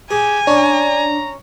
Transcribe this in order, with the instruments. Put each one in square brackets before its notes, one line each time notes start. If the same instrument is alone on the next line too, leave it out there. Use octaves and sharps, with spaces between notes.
[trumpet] G4 [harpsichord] G#4 [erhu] G#5
[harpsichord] C#4 [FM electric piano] D4 D5 [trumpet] A#5